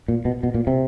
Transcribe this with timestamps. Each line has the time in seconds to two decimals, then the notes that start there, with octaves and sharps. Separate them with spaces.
0.08 A#2
0.25 B2
0.43 B2
0.54 A#2
0.67 C3